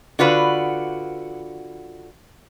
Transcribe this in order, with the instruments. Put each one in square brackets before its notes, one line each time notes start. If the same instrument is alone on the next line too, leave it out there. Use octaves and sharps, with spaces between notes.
[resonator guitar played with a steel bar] D3 F4 F#4 B4